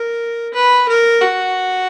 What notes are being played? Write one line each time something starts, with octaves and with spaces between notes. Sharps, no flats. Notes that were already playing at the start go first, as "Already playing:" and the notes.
Already playing: A#4
B4
A#4
F#4